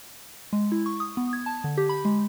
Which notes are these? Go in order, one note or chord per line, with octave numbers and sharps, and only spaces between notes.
G#3
E4
C#6
D#6
B3
G#6
A5
D3
G4
B5
G#3